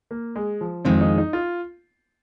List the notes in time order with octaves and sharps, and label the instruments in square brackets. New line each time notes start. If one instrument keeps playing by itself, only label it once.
[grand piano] A#3
G#3
F3
[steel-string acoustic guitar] F2 D#3 G#3 [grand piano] C4
[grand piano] D#4
D#4
F4